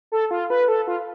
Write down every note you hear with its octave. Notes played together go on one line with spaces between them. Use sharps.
A4
F4
B4
A4
F4